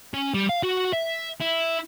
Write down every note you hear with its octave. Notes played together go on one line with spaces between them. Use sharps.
C#4
G3
F5
F#4
E5
E4